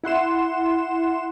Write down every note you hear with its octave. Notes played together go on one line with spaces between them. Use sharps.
E4 F#5 C6 E7